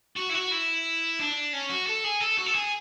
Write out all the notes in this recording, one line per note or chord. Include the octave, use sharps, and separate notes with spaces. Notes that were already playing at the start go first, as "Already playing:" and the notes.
F#4
E4
F#4
E4
D4
C#4
F#4
A4
G#4
A4
F#4
A4
G#4